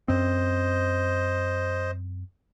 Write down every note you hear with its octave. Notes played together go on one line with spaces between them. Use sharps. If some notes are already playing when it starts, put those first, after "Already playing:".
F#2 C4 C5 D#5